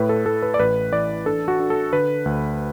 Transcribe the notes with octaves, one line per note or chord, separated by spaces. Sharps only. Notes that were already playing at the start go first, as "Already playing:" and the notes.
Already playing: A2 B4
A4
A2 A4
B4
D5
A1 B4
E3 D5
D4 A4
F#4
D4
A4
D3 B4
D2